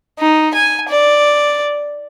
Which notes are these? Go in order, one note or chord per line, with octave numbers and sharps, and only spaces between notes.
D#4
G#5
D5